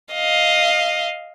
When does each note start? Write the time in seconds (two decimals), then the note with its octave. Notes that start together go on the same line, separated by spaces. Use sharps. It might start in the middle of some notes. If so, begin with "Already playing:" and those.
0.14 D#5 F5